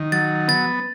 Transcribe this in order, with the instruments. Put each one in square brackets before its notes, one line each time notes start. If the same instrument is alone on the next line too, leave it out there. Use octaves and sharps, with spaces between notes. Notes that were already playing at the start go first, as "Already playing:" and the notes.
Already playing: [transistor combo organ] D#3
[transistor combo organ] F#3 [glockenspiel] A6
[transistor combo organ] B3 [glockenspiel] A6